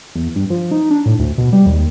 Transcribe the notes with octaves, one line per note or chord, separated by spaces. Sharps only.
E2
G2
F3
D#4
D4
A2
D2
B2
G3
D#2